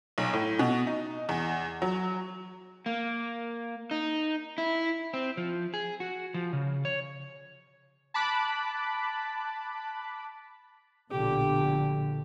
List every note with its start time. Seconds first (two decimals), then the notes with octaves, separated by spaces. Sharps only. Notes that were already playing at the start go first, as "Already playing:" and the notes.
0.18 B1
0.33 A2
0.59 B2
0.87 D#4
1.29 E2
1.82 F#3
2.86 A#3
3.91 D#4
4.58 E4
5.14 C4
5.37 F3
5.74 G#4
6.00 F#4
6.34 F3
6.53 C#3
6.85 C#5
8.14 A5 B5 D6 F#6
11.11 A#1 B2 D3 G4